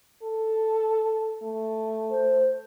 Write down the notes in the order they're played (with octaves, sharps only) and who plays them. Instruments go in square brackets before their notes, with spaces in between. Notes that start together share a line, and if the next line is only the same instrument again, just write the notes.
[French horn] A4
A3
[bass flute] C5